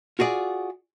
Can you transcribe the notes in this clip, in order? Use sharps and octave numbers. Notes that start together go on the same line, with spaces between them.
F4 F#4 G#4 D5